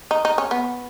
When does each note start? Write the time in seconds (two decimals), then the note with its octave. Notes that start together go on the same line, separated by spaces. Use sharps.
0.11 D#4
0.25 D#4
0.38 C#4
0.51 B3